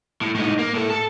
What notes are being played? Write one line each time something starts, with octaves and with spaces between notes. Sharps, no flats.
A2
A2 D#4
A#3
A2 A4
A4 A5